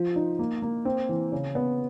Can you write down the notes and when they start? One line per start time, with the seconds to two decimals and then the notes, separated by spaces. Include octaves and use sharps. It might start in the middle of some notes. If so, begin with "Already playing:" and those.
Already playing: F3
0.16 D#4
0.39 A#3
0.62 A#3
0.85 C4
1.09 E3
1.32 C#3
1.55 B3